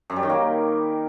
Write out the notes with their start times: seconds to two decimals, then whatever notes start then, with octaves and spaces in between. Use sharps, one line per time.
0.10 F#2
0.16 G3
0.23 D#3
0.29 A#3